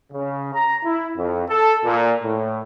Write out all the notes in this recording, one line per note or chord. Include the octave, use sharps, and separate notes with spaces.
C#3
A#5
E4
F2
A4
A#2
A2